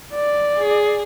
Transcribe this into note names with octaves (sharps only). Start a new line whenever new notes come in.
D5
G#4